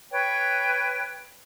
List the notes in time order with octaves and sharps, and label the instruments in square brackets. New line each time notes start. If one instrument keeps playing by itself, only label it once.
[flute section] B4 C#5 G5